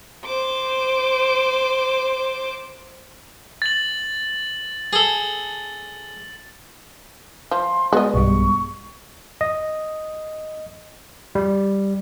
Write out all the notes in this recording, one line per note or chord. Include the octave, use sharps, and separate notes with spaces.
C5 D6
A6 F#7
G#4 A4
F3 C6
G#3 B3 F#4 D5 D#5
B1 G2 G3 C#6
D#5
G3